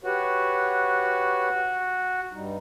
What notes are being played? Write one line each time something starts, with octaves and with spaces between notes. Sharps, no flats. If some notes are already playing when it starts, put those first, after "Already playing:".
F#4 G4 B4 C#5
G2 G3 D#4